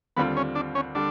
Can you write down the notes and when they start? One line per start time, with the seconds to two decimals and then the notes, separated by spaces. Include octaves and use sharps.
0.17 D#2 D3 G3 B3 C4 F4
0.37 C#4
0.55 D4
0.75 C#4
0.95 D3 G3 D4